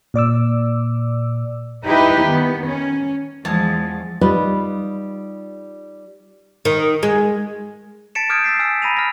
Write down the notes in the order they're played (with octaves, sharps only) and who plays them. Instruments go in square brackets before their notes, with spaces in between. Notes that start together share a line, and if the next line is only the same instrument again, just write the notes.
[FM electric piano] A#2 D5 D6 E6
[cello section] D#4 E4 G4 B4
D#3 B3
C#4
[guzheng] E2 [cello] F3 [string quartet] G#3 [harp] A5 G#6 A6
[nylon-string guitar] G3 D#4 F4 B4
[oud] D#3
G#3
[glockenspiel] A5 A6 B6 C#7 D7 E7
D6 D#6 F6 G6 G#6 D7
E6 A6 B6 C7
G#5 E6 F6 B6 D7
A#5 B5 A#6 D#7 F7
F6 A#6